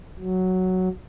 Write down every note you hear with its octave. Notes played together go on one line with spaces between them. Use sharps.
F#3